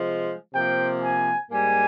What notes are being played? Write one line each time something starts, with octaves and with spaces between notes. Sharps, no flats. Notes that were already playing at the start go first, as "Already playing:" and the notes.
Already playing: C3 F3 G#3
C3 F3 A#3 G5
G#5
G#2 G3 A#3 G#5